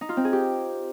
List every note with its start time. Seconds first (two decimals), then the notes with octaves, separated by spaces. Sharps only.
0.01 D#4
0.09 F4
0.17 C4
0.25 G#4
0.33 G4